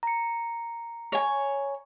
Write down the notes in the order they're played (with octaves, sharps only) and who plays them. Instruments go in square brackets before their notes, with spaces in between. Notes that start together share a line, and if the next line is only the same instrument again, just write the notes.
[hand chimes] A#5 C#7
[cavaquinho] C#5 G#5